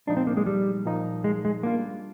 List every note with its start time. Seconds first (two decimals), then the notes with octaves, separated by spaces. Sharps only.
0.07 A#2 F3 G#3 D4 D#4
0.17 C4
0.27 A#3
0.37 G#3
0.46 G3
0.86 A#2 F3 A#3 D#4
1.24 G#3
1.45 G#3
1.63 G3 A#3 D4 F4